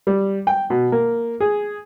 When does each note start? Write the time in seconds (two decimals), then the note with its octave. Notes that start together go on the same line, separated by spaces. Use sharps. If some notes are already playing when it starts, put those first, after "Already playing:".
0.07 G3
0.47 G5
0.70 B2
0.92 A#3
1.40 G#4